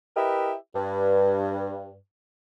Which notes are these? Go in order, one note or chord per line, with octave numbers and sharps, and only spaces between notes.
E4 G4 A#4 B4 D#5 E5
G2